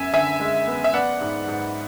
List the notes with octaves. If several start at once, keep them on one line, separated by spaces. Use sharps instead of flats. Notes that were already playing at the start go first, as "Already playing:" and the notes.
Already playing: F#2 B3 E5 G#5
D3 E5 G#5
G#3
B3
E5
B3 D5 F#5
G#2
G#2